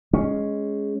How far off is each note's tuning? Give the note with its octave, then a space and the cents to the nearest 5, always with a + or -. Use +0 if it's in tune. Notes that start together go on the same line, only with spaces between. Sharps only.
G#3 +0 C#4 +0